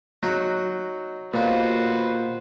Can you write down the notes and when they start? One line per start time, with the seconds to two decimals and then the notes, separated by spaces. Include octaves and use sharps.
0.23 F#3 D#4 F#4
1.34 D#2 A#2 B3 F#4 B4 C5